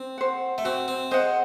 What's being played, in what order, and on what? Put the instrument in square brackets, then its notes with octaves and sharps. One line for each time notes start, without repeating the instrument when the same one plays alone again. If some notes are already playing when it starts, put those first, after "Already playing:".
Already playing: [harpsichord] C4
[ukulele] C5 F#5
[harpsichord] A3
[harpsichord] C4 [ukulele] F#4
[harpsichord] C4
[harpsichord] G#3 [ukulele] C5 F#5